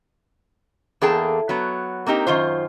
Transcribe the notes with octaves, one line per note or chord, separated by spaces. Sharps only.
E2 A#3 G#4 A4 G5 A5
F#3 B3
A#3 C4 D#4 G4
F#2 D#3 F4 C5